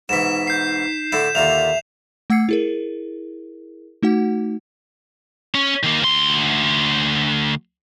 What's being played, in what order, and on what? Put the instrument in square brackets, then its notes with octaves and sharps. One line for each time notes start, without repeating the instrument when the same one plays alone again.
[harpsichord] G#2 B2 E3 [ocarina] D#4 [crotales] B6 E7
[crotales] G6 C7
[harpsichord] A2 D3 E4 [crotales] E7
[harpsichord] D#2 A#2 D3 [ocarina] E5 [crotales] F7
[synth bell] A3 F#5 E6 G#6 C7 C#7
E4 G#4 A#4
A3 D#4 F#4 F#5
[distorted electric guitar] C#4
D#3 A#3
D2 C6